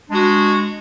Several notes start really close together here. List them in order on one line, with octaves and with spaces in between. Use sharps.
D4 G#3 F#4